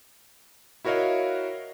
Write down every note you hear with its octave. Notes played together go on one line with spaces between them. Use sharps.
E4 F#4 A#4 C#5 D#5 F5